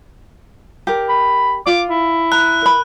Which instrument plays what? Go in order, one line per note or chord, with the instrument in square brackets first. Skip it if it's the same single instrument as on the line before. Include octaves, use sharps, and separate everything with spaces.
[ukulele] G4 A#4
[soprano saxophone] B5
[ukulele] F4 [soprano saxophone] D6
[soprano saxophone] E4
[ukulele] A#5 [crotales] F#6
[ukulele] A#4 B5